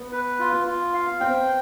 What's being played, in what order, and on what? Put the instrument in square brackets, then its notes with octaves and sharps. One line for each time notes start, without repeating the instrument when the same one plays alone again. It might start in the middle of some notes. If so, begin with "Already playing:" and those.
Already playing: [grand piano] B3
[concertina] B4
F4
F4
F5
[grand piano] C4 [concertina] G5